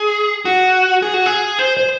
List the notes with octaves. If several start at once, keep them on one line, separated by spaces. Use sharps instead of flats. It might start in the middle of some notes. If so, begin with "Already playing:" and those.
Already playing: G#4
F#4
G#4
F#4
G#4
C5
C5